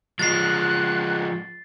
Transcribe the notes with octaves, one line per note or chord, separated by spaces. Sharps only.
F3 G#3 F#6 A6 C7